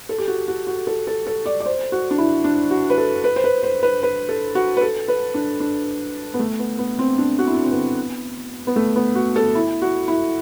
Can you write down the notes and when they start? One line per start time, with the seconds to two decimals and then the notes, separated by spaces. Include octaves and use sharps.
0.09 A4
0.18 G4
0.28 F#4
0.48 F#4
0.67 F#4
0.87 A4
1.07 A4
1.27 A4
1.46 D5
1.60 D5
1.66 C5
1.92 F#4
2.11 D4
2.18 E4
2.44 D4
2.71 F#4
2.90 B4
2.98 A4
3.24 B4
3.36 C5
3.44 B4
3.63 C5
3.83 B4
4.03 B4
4.29 A4
4.55 F#4
4.77 B4
4.81 A4
5.08 B4
5.34 D4
5.60 D4
6.34 B3
6.39 A3
6.59 B3
6.79 B3
6.99 C4
7.18 D4
7.39 F#4
7.47 E4
7.55 D4
7.63 C4
7.72 B3
8.67 B3
8.76 A3
8.96 B3
9.15 F#4
9.36 A4
9.55 E4
9.82 F#4
10.08 E4